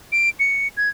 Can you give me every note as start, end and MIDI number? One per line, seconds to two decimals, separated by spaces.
0.12 0.30 98
0.40 0.68 97
0.77 0.89 92